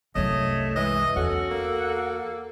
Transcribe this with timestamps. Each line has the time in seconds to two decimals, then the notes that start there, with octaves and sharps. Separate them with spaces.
0.15 C2 F#2 A3 C#5 D#5
0.76 E3 G#3 D#5
1.16 E2 C#4 F#4 A4
1.50 A#3